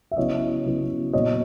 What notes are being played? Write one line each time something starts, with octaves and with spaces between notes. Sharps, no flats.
E5
C#3 F#3 B3 E4 C#5 D#5
C#3 F#3 B3 E4
A#2 F#3 B3 C#5 D#5